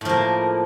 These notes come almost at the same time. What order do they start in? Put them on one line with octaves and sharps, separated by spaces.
A2 F3 A#3